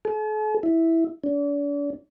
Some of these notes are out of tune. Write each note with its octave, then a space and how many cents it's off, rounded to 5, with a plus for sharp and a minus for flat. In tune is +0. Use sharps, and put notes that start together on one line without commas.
A4 -45
E4 -5
D4 -40